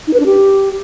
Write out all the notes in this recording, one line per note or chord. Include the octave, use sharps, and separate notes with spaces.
D#4
B4
D4
G4